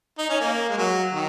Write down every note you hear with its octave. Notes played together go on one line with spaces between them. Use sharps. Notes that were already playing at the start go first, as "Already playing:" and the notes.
D#4
C#4
A#3
G#3
F#3
D#3